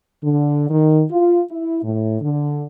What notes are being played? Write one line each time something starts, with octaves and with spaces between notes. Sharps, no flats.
D3
D#3
F4
E4
A2
D3